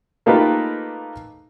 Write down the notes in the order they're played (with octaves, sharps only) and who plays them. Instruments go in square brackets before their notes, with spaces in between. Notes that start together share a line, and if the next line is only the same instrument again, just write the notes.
[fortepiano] A3 A#3 D#4 F4 G4 B4